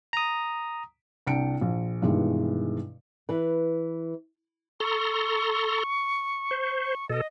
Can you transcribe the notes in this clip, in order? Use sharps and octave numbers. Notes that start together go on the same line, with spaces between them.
A#5 D#6
C2 D4 G5 C#7 D7
A#1
G2 B2 D#3 E3 G#3
E3 B4
A4 A#5 C6 C#6
C5
B2 A4 D#5